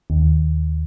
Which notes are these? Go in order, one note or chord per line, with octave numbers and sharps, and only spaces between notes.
D#2